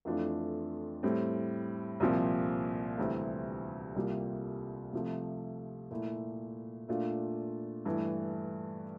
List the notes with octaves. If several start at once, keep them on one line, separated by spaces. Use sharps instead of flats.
F2 E3 A3 D4 F4
A2 G3 C4
C2 A#2 F3 C4
D2 C3 E3 G3 C4
C2 C3 G3 A#3 F4
C3 F3 A3
A#2 A3 E4
A#2 A3 D4 F4
G2 E3 A3